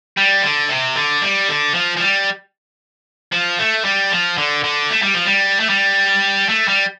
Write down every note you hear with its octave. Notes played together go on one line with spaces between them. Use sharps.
G3
D3
C3
D3
G3
D3
F3
F3
G3
F3
A3
G3
F3
D3
D3
A3
G3
F3
G3
A3
G3
A3
G3